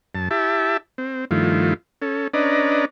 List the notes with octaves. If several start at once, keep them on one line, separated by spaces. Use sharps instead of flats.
F#2 A5
E4 G4 E5 A5
C4
G2 D#3 F3 A3 E4 F4
C#4 A4
C#4 D4 B4 D5 D#5 A#5